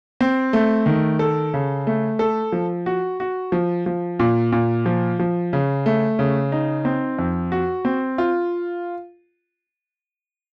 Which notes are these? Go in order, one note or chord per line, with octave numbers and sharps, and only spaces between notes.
C4
A3
D#3
A4
C#3
A3
A4
F3
F#4
F#4
F3
F3
A#2
A#2
F3
F3
C#3
A3
C#3
D#4
C4
F2
F#4
C4
F4